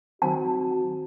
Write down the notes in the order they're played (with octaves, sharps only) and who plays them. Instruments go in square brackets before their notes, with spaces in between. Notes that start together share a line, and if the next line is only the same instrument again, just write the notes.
[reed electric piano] D#3 F#3 C4 [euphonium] F#4 [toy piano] A5